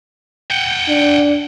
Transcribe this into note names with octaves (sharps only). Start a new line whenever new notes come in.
F#5 G5
D4